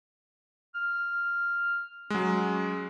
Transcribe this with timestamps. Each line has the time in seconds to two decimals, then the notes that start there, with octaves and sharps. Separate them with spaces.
0.75 F6
2.10 F#3 G#3 C#4